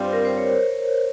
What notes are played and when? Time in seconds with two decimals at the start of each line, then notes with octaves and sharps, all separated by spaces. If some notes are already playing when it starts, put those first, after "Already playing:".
Already playing: G2 G3 C4 F4
0.13 A#4
0.25 C5
0.37 C#5